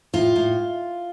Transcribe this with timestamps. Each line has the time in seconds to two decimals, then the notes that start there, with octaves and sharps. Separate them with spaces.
0.13 A2 F4
0.36 A2